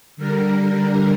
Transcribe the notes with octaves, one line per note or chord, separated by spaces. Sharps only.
D3 G3 A#4